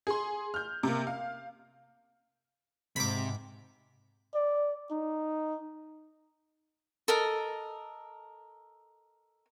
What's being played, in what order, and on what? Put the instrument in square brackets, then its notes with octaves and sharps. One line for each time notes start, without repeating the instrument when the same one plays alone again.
[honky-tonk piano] G#4 C6
F6 G6
C3 A#3
F5
[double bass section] G#2 [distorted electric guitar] C3 [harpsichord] B5 D6
[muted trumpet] D5
D#4
[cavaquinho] A4 A#4 D#5